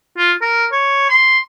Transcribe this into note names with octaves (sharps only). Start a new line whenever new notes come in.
F4
A#4
C#5
C6